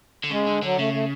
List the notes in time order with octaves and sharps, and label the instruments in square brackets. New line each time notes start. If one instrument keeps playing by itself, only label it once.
[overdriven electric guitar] D3
[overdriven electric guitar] C#3 [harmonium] G#3
[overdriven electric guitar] D3
[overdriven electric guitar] D3 [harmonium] F#3
[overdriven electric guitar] C#3 [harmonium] A3
[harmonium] A3